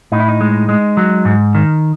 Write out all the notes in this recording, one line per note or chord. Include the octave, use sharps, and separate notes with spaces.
A2 D#4
E4
D#4
G#3
G#3
F#3
G#2
D#3